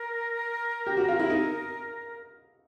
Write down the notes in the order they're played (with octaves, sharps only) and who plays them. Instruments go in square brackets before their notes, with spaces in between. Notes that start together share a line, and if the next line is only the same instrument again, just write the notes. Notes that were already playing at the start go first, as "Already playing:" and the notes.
Already playing: [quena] A#4
[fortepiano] G4
F#4
F4
E4
D#4